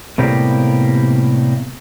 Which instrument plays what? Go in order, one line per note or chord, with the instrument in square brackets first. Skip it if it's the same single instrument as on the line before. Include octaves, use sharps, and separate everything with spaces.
[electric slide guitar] A2 C3 G3 A#3 B3 G4